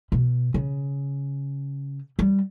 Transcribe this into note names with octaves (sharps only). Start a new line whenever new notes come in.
B2
C#3
G3